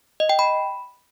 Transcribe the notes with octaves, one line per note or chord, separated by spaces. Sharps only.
D#5
G5
B5